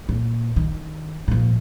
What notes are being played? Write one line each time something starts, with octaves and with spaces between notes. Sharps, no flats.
A#2
D#3
A#2 F3